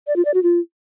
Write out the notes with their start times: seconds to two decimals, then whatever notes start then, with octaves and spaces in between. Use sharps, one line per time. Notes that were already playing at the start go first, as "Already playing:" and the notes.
0.07 D5
0.16 F4
0.25 D5
0.34 F#4
0.43 F4